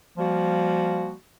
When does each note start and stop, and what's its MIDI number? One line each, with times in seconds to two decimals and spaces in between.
0.18 1.13 53
0.18 1.13 55
0.18 1.13 58
0.18 1.13 66